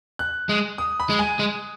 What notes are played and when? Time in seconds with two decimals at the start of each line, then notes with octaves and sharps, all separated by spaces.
0.19 F#6
0.49 G#3
0.78 D#6
1.00 B5
1.10 G#3
1.19 G#5
1.39 G#3